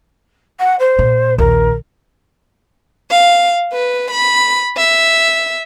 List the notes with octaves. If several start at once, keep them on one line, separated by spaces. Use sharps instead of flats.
F#5
C5
A#2
A#1 D#2 A#4
F5
B4
B5
E5